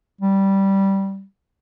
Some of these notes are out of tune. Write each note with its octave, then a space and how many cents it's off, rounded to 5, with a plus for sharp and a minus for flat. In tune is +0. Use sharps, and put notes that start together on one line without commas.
G3 -10